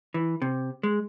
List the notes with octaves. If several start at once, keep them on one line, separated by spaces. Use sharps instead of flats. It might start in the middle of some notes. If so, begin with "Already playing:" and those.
E3
C3
G#3